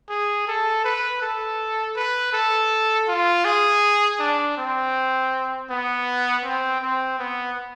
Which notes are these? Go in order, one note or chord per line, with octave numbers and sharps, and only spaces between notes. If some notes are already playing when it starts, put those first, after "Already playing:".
G#4
A4
B4
A4
B4
A4
F4
G#4
D4
C4
B3
C4
C4
B3